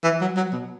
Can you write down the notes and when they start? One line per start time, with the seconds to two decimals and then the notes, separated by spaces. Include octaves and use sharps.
0.04 E3
0.21 F#3
0.37 F#3
0.53 B2